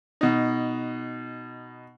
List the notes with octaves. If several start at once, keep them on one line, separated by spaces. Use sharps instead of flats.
B2 D#4